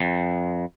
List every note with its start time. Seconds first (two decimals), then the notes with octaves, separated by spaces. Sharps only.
0.01 F2